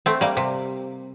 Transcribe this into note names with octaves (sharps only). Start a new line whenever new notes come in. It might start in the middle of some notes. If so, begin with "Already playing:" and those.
A3 C4
G3 A#3
C3